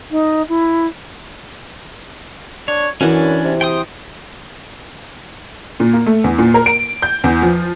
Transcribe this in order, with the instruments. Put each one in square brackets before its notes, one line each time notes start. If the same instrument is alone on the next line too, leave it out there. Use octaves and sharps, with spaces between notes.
[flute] D#4
E4
[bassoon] D4 [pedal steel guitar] C#5
[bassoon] F#2 [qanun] E3 F#4 [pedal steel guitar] C#4 D4 E4
[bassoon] C3
[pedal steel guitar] G5 C6 D#6
[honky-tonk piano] A#2
A#3
A3
E2
A#2
A#4
D7
G6
E2
F3